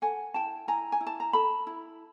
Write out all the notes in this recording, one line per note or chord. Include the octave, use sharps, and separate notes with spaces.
A4 F#5 G#5
E4 G5 A5
E4 G#5 A#5
G#5
E4
A5
A#5
A4 A5 B5
E4